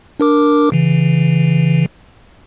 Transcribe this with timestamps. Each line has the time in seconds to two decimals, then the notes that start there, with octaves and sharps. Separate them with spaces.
0.20 D4 A#4 D6
0.72 C#3 E3